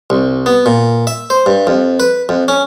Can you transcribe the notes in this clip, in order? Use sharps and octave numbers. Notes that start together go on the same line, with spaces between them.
C2
B3
A#2
E5
C5
G2
F2
B4
F2
C#4